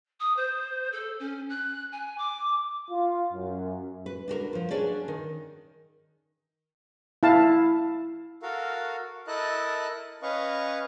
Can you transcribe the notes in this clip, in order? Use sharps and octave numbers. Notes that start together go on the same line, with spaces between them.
D#6
C5
A4
C#4
F#6
G#5
D6
F4
F#2
B4
D4 F#4 G4 A#4
F3 F4
C#4 D4 F#4 G#4 C#5 D5
D#3
E4 F5 A5
F#4 A4 A#4 F5
E4 A4 A#4 D#5 A5 F#6
C#4 B4 D#5 F5 C#6